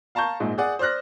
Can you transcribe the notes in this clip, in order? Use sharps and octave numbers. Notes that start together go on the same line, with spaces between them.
F5 A5 A#5 C#6 G6
A#1 G#2
G#4 D5 F#5 D#6
C5 D5 F6 F#6 A#6